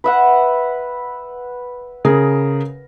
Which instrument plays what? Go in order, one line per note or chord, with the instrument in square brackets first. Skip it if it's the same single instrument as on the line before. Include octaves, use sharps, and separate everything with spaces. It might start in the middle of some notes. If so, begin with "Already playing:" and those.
[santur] B4 E5 F#5
[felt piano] C#3 G#4 A#4